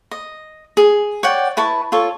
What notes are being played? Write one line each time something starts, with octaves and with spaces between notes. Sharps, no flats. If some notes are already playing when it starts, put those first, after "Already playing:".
D#5
G#4
C#5 D5 F#5 G5
E4 B4 A5 C#6
F4 A4 C#5